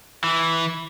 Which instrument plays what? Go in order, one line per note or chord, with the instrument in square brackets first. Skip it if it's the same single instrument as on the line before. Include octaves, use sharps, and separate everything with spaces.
[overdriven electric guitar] E3